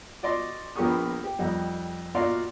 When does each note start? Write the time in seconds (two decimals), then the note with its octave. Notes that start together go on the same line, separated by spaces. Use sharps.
0.23 F#4 D5 D#5 C6
0.76 A#1 A#3 B3 G4 C#6 D#6
1.24 G4
1.39 F2 G3 D#4 F#5
2.15 A#2 F#4 D5 D#5 F5 C6